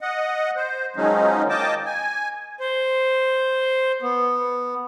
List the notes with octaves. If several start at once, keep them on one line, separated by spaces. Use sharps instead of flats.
D#5 F#5
C5
D#3 F3 F#3 G#3 C#4 D#4
A#3 D#5 G5 A5 D6
G#5
C5
B3